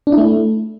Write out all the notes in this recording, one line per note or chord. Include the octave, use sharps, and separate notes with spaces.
D4
E4
A3